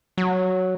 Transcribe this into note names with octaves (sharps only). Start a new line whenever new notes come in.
F#3